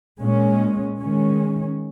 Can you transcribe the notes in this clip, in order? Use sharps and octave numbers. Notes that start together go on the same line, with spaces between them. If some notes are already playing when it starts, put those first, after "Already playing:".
A#2 G#3 C#4
D#3 G#3 C#4